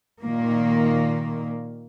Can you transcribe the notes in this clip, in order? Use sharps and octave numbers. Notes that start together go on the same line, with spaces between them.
A#2 D#3 A#3